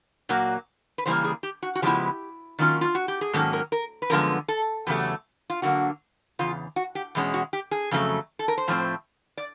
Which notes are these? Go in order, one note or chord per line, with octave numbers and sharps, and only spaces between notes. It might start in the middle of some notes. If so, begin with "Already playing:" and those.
A#2 F#3 A#3 F#4
B4
C#3 E3 G3 A#3 C5
G#4
G4
F#4
F#4
C#3 F3 G#3 B3 E4 G4
D#3 F#3 A#3 C#4 F4
F4
F#4
G4
G#4
G#2 D#3 F#3 A#3 C#4 A4
A#4
A#4
B4
F#2 D3 F3 G#3 B3 A#4
A4
E2 C#3 F#3 A3 G4
F4
D3 F#3 A#3 F#4
E2 C#3 F4
F#4
G4
E2 B2 G#3 C#4
F#4
G4
G#4
F2 C#3 F#3 A3
A4
A#4
C5
A2 F3 A3 C4
D5